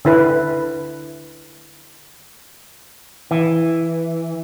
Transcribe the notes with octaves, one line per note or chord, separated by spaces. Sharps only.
D3 E4 B4
E3